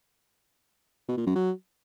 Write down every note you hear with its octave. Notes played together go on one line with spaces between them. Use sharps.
B2
A#2
F#2
F#3